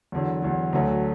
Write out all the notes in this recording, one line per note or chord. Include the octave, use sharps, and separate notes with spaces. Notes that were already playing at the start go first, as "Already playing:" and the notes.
E2 D3 F#3
E2 D3 F#3
D2 D3 F#3 A3